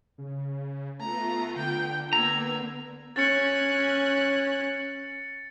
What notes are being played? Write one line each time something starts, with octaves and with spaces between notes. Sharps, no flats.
C#3
A3 B3 F4 A#5
D3 G5
A#3 B3 A#5 E6 G#6
C#4 F#6 A6 C#7